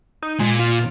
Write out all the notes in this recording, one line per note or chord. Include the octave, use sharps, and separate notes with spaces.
D#4
A#2 G#3
F4